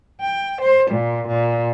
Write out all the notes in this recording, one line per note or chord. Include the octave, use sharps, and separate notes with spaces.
G5
C5
A#2
A#2